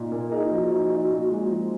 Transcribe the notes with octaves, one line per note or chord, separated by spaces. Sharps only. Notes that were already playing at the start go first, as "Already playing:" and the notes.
Already playing: A#2 D#4
A#2 A#4
D#4 G#4
F4
F3 F#4
D#4
D#4
A#2
G#3
F3